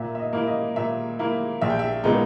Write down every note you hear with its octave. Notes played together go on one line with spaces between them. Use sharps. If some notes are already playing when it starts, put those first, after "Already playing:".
Already playing: A#2 E5
E5
D#5
A#3 E4
D#5
A#2 E5
A#3 E4
A#1 E5
G5
E5
A#2 G#3 B3 D#4